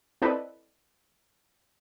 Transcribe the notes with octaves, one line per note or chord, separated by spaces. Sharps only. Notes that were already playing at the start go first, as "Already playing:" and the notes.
C4 E4 A4 B4 D5 D#5